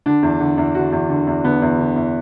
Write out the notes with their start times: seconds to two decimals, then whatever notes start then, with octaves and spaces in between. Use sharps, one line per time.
0.06 D3 D4
0.22 E2
0.40 D3
0.57 E2
0.75 D3 F#4
0.92 E2
1.09 D3
1.27 E2
1.44 D3 B3
1.62 E2
1.79 D3
1.96 E2